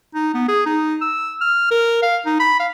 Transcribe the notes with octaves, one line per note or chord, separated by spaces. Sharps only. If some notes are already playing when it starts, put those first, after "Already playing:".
D#4
B3
G#4
D#4
E6
F6
A#4
F5
D#4
B5
F5